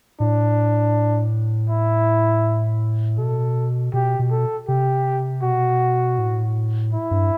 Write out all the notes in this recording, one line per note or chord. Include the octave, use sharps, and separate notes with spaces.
A2 D4
E4
B2 A4
B2 G4
B2
A4
C3 G4
B2 F#4
A2
E4
G2